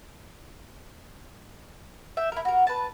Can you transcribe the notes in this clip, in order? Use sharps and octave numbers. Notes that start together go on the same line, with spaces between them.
E5 G5
E4 A#4
F#4 A#4
B4 A5